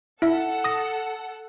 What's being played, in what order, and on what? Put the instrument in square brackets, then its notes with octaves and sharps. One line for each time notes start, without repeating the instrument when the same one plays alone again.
[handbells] E4 E5 [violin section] A4 F#5
[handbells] D#6 A#6